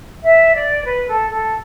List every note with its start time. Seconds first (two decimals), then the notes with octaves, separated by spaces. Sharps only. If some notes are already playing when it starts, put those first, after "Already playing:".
0.23 E5
0.54 D5
0.84 B4
1.08 A4
1.29 A4